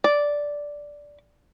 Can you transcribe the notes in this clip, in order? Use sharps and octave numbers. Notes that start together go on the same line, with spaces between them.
D5